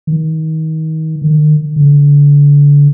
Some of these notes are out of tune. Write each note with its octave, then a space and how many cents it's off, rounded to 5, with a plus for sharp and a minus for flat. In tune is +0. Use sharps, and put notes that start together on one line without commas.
D#3 +30
D#3 -40
D3 -30